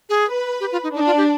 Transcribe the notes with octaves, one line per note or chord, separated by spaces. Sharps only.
G#4
B4
G4
F4
D#4
D4 D#4
F4
G4